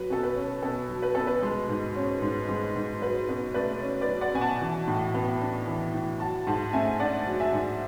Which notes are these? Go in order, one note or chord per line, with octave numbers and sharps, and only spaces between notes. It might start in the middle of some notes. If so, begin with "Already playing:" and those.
Already playing: F#3 B4
B2 A4
B4
C#4
B2 A4
F#3
B4
B2 A4
B4
G#3
G#2
C#4
G#2
G#3
G#2
F#3 B4
B2 B4
A3 B4 D5
C#4
B4 D5
F#3
D5 F#5
B2 G#5
F#5 A5
E3
A2
B3
D4
E3
A2
F#3 F#5 A5
G#2 F#5 A5
F#5
A3 E5 G#5
D4 D5 F#5
F#3
E5 G#5
G#2